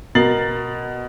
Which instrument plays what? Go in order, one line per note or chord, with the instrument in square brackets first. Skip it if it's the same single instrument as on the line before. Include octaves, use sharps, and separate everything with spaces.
[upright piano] B2 A#4 A6 C7 F#7